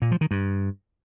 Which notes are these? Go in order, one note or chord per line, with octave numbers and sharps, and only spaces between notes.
A#2
F3
D#3
G2